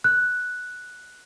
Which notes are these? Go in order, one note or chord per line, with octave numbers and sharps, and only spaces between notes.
F#6